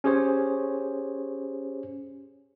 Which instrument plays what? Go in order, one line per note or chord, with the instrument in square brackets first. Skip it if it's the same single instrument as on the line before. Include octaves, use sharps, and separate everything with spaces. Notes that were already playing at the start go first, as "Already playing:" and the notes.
[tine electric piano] C#4 G4 G#4 C5 C#5